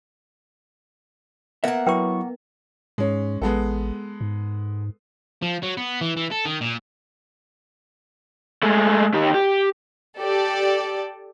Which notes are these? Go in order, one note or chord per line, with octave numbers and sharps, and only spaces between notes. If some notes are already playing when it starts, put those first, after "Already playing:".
A#3 B3 A#4 E5 F#5
F#3 E4 B4 G5 C#6
G#2 G#3 C#4
A1 G#3 B3 A4
G#2
F3
F#3
B3
E3
E3
A4
D#3
A#2
G#3 A3
D#3 G4
G4
G4 A4 D5